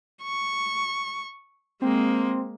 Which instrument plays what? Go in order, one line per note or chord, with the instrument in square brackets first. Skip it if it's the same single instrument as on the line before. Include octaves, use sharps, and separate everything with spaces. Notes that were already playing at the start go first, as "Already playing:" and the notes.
[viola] C#6
[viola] G#3 A#3 [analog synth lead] C4